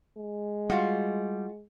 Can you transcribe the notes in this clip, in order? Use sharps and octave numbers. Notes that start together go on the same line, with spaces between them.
G#3
G3 F4 F#4